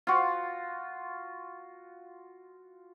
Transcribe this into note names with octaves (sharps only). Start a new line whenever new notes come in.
F4 F#4